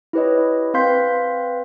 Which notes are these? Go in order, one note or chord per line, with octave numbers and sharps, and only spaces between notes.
E4 G4 B4 C#5 D#5
C4 B4 F5 C6 G6 B6